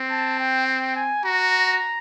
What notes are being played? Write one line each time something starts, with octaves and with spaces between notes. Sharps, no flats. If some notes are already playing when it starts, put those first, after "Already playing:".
Already playing: C4
A5
G5
G5
G#5
F#4 A#5